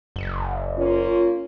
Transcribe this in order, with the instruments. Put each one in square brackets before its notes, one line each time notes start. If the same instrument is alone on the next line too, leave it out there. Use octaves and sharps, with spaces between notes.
[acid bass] F#1
[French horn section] A#3 C#4 F4